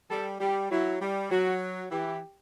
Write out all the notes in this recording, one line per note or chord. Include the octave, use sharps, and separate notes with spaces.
G3 A4
G3 G4
F#3 E4
G3
F#3 F#4
E3 G4